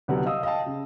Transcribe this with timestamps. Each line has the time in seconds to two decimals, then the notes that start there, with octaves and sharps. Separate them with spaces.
0.08 C2 D3 F#3 G3 B3
0.26 D#5 F5 D#6 E6
0.43 D#5 F5 G5 A5
0.66 C#3